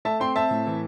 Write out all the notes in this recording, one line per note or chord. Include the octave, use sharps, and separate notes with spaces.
A3 E5 A5
C4 G5 C6
C4 E5 A5
A2
E3